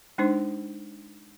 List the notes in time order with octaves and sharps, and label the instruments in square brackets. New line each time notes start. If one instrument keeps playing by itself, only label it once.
[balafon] G#3 D4 D#4 C5